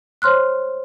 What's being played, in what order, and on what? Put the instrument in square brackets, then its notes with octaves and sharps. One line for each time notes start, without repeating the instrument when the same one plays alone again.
[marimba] C5 C#5 C6 F6 F#6